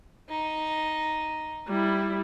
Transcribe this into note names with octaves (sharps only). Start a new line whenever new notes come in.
D#4
G3 E4